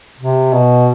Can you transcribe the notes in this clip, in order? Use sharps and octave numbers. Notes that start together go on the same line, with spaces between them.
C3
B2